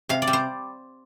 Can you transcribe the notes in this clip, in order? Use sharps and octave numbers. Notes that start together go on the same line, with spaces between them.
C3 F5
D5
G3
C5